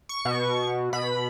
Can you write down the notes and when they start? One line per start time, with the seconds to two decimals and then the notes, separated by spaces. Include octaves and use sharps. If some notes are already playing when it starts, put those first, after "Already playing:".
0.09 C#6
0.25 B2
0.93 B2 B5